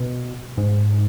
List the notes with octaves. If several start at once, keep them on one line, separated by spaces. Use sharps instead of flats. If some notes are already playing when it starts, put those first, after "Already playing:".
Already playing: B2
G#2